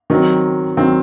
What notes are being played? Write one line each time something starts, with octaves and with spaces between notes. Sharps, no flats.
D#3 F#3 C4
D#3 F#3 C4